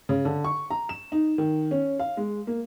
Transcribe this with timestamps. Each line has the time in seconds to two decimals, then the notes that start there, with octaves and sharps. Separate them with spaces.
0.09 C#3
0.25 D3
0.44 C#6
0.71 A#5
0.89 E7
1.12 D#4
1.38 D#3
1.71 C#4
1.99 F5
2.17 G#3
2.47 A#3